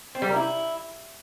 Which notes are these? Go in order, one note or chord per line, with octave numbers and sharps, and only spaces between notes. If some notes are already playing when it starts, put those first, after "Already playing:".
C4
G3
A#3
E4